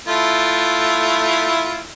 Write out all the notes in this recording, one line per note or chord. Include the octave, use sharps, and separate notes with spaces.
A3 E4 F4